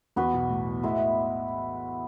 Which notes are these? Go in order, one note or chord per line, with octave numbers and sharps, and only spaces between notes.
E2 E3 B3 F#4 B4
B1 B2
A2
A2 G#3 B3 E4